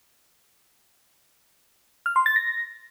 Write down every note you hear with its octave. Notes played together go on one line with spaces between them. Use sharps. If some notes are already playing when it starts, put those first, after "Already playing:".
F6
C6
A6
A#6